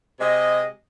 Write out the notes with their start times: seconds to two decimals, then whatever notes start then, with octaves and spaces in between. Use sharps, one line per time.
0.20 C3 G#3 D#5